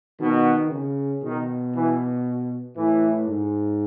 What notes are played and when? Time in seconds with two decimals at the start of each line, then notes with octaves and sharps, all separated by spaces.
0.20 B2 D#3
0.71 C#3
1.23 B2 D#3
1.74 E3
2.77 A2 E3
3.28 G#2